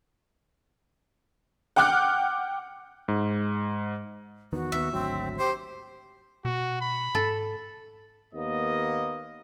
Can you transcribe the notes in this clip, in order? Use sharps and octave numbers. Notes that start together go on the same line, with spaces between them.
F#5 G5 D6 F6 F#6
G#2
E2 D#3 B3 F#4
D#2 D#3 B3 E5
G#1 D2 F#3 C4
G4 C5
B2 F#4
B5
G#2 A4
D#2 A#3 B3 D#5